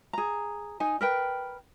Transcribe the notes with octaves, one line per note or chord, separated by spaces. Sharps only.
G#4 A#5
D#4 G#5
A#4 B4 G5